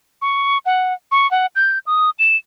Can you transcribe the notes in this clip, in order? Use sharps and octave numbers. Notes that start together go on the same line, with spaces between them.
C#6
F#5
C#6
F#5
G6
D#6
E7